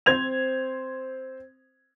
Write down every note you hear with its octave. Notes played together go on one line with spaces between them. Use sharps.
C4 C5 G#6 F7